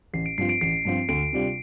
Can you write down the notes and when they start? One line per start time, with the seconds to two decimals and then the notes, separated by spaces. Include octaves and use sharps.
0.13 A1 C7
0.26 D7
0.38 G2 F3 C4 F4 C7
0.49 D7
0.61 A1 C7
0.85 G2 F3 C4 F4
1.08 D2 D7
1.33 C3 G3 D4 F4